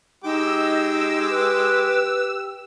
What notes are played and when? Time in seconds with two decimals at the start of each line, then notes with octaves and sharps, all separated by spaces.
0.24 G#3 D#4 G4 G5 D6 E6
1.30 B4